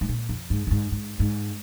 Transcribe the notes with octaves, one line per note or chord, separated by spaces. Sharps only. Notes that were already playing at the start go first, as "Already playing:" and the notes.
G#2
A#2
F2
G#2
A#2
G#2
G#2
G#2